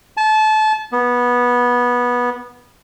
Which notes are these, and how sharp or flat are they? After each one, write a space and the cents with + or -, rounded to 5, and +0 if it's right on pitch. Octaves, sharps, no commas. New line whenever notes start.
A5 -25
B3 -15